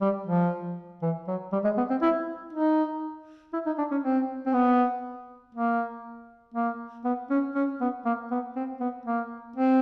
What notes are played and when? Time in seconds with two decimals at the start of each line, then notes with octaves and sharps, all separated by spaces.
0.02 G3
0.27 F3
1.02 E3
1.28 F#3
1.53 G3
1.65 G#3
1.77 B3
1.90 C4
2.02 E4
2.53 D#4
3.53 E4
3.66 D#4
3.78 D4
3.91 C#4
4.04 C4
4.47 C4
4.54 B3
5.55 A#3
6.54 A#3
7.05 B3
7.30 C#4
7.55 C#4
7.81 B3
8.05 A#3
8.31 B3
8.56 C4
8.81 B3
9.06 A#3
9.56 C4